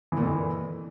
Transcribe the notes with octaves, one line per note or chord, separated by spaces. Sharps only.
E3
A#2
F2
E3